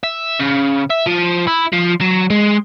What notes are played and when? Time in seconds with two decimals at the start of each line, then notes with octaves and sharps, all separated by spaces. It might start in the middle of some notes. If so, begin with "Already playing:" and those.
0.03 E5
0.39 C#3
0.90 E5
1.06 F3
1.47 E4
1.72 F3
2.01 F#3
2.30 G#3